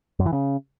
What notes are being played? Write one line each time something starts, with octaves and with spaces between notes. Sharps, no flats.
F#2
E3
C#3